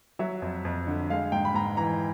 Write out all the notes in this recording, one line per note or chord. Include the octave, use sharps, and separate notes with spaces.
F#3 E5
F2
F2
D3
G#3 F5
G#2 G5
B5
G#2 A#5
E3 A#5